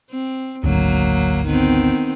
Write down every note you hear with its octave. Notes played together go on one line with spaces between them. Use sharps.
C4
G#1 D2 F#3 A#3
D#3 B3 C4